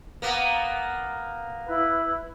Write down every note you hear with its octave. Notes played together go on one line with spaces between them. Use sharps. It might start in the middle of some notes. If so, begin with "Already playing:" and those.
A#3 B3
E4 B4